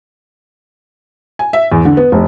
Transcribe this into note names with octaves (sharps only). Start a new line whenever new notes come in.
G#5
E5
E2
D3
B3
F1